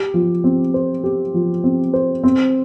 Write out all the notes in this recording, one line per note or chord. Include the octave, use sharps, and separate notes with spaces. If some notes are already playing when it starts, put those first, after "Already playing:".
Already playing: G4
F3
C4
C5
G4
F3
C4
C5
C4